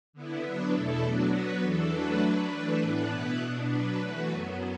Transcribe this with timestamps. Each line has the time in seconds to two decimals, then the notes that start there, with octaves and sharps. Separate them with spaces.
0.13 D3 B3 E4
0.43 F#3 B3 D4 B4
0.73 E2 B2 A3 E4 A4
1.03 F#3 B3 D4 F#4
1.32 F#3 B3 F#4 B4
1.62 E2 E3 D4 A4
1.92 F#3 A3 D4 F#4 B4
2.21 F#3 D4 B4
2.51 E3 A3 D4 B4
2.81 A2 E3 B3 D4 B4
3.10 B2 B3 E4 B4
3.40 B2 B3 D4
3.69 F#3 D4 B4
3.99 E3 A3 F#4 B4
4.29 F#2 F#3 B3